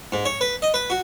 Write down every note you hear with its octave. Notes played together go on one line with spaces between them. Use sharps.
G#2
C#5
B4
D#5
B4
F#4